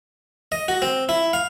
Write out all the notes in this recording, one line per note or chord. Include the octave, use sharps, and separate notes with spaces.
D#5
F#4
C4
E4
F5